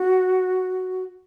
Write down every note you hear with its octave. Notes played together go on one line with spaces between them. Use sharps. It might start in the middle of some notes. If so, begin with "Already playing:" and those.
Already playing: F#4